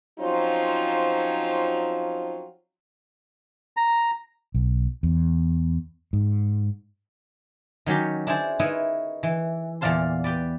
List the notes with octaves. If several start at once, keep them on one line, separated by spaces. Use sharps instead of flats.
F3 F#3 C4 C#4 D#4 F4
A#5
B1
E2
G#2
D#3 F#3 C#4 G4
D4 E4 G#4 C5 A5
D#4 E4 A#4 B4 C#5 D#5
E3
E2 A#2 D5 F5 A5 C6
G4 B4 D5